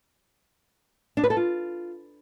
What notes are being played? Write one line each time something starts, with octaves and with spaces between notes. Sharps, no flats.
D4
B4
A4
F4